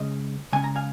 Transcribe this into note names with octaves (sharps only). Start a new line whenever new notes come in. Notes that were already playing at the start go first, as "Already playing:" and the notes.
Already playing: C#3 G#3 C#4 D#5
C#3 G#3 C#4 G#5
A#5
F5 G#5